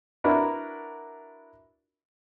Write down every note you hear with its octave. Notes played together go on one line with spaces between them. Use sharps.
D4 E4 F#4 A#4 B4